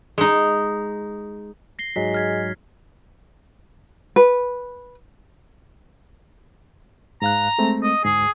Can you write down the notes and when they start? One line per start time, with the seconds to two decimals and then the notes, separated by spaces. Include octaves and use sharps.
0.18 G#3 D#4
1.79 A#6 C7 G7
1.96 G#2 F#3 G#3 B6
2.14 F6 G#6 B6
4.16 B4
7.22 G#2 F5 A#5 F#6
7.58 G#3 A3 C4
7.83 D#5
8.04 D2 G#2 G#4